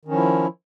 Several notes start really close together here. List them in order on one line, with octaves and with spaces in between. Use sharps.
D#3 C#4 F3 E4